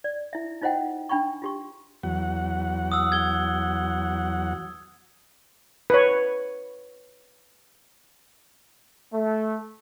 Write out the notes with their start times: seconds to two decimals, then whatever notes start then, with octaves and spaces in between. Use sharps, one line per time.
0.04 D5
0.33 E4 E5
0.62 D#4 F4 C5 D#5 F#5 G5
1.09 D4 G5 B5 C#6
1.42 F4 G4 C#6
2.03 E2 F#3 F#5
2.92 D#6 E6
3.12 G#6 G7
5.90 B4 C#5
9.13 A3